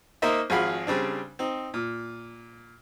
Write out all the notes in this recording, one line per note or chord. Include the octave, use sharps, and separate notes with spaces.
A#3 D#4 A#4 C5 D#5 E5
G#1 F3 F#4 G#4 F5 B5
C#3 G3 C4 D4
C4 D#4
A#2